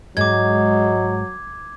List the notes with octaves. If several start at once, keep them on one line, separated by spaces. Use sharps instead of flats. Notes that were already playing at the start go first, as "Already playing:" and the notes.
G#2 F#3 G#3 D6 G#6